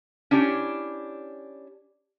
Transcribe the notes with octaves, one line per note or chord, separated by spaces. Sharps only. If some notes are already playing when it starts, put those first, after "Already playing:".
C#4 D4 E4 G4 C#5